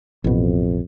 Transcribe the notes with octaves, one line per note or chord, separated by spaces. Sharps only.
A1 F2 B2